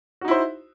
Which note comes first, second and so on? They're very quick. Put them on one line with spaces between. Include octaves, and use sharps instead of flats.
F#4 D#4 E4 C5